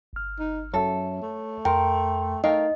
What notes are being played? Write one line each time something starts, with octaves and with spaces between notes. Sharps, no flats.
G1 F6
D#4
F#2 A4 C#5 E5
A3
F2 A#4 G5 C6
A3 D#4 A#4 D#5 F5 G5